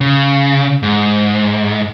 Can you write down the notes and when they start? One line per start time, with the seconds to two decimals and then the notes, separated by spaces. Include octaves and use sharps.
0.01 C#3
0.83 G#2